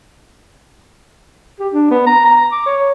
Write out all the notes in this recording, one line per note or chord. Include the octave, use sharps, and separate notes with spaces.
G4
D4
B3
A#5
A#5
D6
C#5